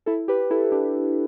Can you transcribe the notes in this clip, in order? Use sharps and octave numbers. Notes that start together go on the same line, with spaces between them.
E4 A4
G4 B4
E4 A4
D4 G4